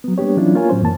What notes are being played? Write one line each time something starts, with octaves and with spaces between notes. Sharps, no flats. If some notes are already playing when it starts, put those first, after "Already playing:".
F#3 B3
G3 A#3 B3 D4 G4 C#5
E3 F#3 C#4 D4 E4 F4
A#3 F4 A#4 C#5 G#5
A2 F#3 C#4 C5
F#2 E3 A#3 A5